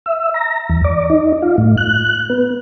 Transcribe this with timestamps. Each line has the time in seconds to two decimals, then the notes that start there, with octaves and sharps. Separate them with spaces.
0.06 E5
0.34 A#5
0.70 E2
0.84 D5
1.10 D#4
1.42 F4
1.58 A2
1.77 F#6
2.29 B3